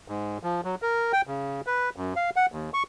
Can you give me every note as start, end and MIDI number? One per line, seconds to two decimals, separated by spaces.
0.08 0.38 44
0.43 0.61 53
0.64 0.75 54
0.82 1.12 70
1.13 1.22 79
1.27 1.61 49
1.67 1.90 71
1.96 2.14 42
2.16 2.30 77
2.36 2.46 78
2.52 2.70 39
2.74 2.83 85